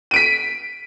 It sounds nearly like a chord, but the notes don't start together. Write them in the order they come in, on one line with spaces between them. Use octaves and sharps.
D#7 D7 B6